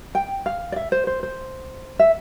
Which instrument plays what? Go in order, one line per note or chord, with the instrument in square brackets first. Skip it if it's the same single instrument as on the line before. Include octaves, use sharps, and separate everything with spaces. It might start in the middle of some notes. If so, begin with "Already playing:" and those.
[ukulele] G5
F5
D5
E5
C5
C5
C5
E5